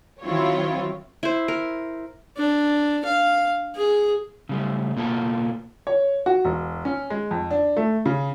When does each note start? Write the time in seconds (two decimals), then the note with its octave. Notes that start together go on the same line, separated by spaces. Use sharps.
0.23 D#3 F#3 C4 E4 F4 C#5
1.23 E4 C5
1.48 A#4
2.37 D4
3.05 F5
3.76 G#4
4.49 C#3 G3 A3
4.96 B2 A#3 B3 F4 A4
5.87 C#5
6.26 F#4
6.45 E1
6.85 C#4
7.10 G#3
7.31 F2
7.51 D4
7.77 A3
8.06 C#3